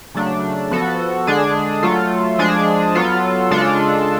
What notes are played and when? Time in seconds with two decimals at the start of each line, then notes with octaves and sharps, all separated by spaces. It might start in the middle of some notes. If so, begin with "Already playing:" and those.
0.15 C#3 F#3 A3 D4
0.71 F3 B3 F#4 A4
1.27 D3 G#3 D4 G#4
1.83 F#3 A3 F4 A4
2.39 F3 G#3 D4 G#4
2.95 F#3 B3 F4 A4
3.51 C#3 G#3 D4 F4 A4